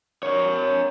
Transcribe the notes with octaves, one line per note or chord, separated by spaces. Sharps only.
A#4 C#5